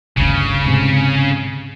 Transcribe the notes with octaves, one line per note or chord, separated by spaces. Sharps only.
D1 G1 D2 C#3
G#2 C3